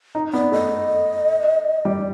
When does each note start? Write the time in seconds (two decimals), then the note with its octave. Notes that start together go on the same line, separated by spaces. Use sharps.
0.15 D#4
0.33 B3 D5
0.52 A3 D#5
1.85 G3 D5